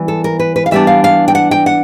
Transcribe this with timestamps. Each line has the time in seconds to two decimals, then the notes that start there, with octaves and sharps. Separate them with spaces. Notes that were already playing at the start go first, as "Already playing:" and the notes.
Already playing: E3 G3 B3
0.08 A4
0.24 A#4
0.39 B4
0.56 B4
0.66 F5
0.71 E3 G3 B3 D4 E5
0.87 F5
1.04 F5
1.28 G5
1.35 F#5
1.51 G5
1.66 F#5